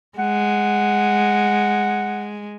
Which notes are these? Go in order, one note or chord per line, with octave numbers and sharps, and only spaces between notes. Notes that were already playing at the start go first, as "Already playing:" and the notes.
G#3 F#5